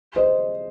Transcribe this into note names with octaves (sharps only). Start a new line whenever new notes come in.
C5 D#5